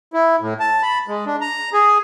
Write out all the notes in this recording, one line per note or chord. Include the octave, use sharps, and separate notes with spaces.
E4
A2
A5
B5
G#3
D4
A#5
G#4